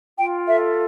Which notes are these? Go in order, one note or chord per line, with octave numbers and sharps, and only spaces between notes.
F4 G5
A4 E5